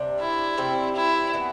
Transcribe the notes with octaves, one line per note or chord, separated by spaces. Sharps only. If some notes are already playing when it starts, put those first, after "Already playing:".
Already playing: C3 G3 D4
E4
C3 G3 C4
E4
E3 B3 F#4